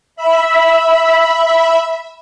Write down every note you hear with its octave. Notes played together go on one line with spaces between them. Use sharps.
E5 B5